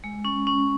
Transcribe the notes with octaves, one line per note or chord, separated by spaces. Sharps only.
G#3
C#4
C#4